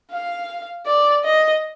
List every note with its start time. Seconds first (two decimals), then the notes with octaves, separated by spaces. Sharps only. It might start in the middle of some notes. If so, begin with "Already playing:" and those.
0.11 F5
0.86 D5
1.24 D#5